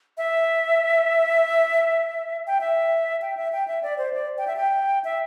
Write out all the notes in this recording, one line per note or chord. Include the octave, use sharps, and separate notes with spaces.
E5
G5
E5
G5
E5
G5
E5
D5
C5
D5
G5
E5
G5
E5